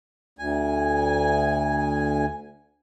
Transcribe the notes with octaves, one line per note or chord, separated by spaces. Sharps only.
D2 G#5